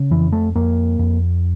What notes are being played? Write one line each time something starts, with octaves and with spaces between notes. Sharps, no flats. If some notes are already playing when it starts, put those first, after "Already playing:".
Already playing: C#3
F2 E3
A3
F2 A#3
F2